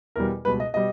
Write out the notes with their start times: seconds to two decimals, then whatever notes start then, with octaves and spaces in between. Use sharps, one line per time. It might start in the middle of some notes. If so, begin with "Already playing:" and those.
0.16 E2 B2 G3 A#4
0.45 C#2 B2 G3 B4
0.60 D#5
0.74 B2 G3 D#5